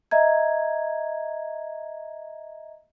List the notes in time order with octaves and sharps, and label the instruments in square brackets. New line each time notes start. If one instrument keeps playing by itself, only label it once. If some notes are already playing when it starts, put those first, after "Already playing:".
[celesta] D#5 E5 A#5 G#6